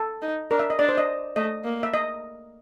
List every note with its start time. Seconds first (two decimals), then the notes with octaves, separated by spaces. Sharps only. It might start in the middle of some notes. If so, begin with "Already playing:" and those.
Already playing: A4
0.22 D#4
0.51 D4 A#4
0.59 E5
0.70 D#5
0.79 D4 D5
0.89 C5
0.98 D#5
1.36 A3 D#5
1.64 A#3
1.83 E5
1.94 D#5